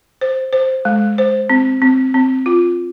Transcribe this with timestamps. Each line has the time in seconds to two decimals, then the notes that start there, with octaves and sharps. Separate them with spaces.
0.21 C5
0.53 C5
0.85 G#3
1.18 C5
1.50 C4
1.82 C4
2.14 C4
2.46 F4